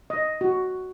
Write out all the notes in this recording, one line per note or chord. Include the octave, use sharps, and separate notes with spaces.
D#5
F#4